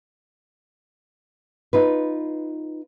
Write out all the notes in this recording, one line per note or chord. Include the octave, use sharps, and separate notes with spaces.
D#4 F4 B4